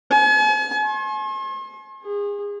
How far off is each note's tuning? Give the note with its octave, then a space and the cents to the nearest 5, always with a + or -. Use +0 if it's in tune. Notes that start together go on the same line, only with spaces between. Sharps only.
G#5 +45
C6 +45
G#4 -30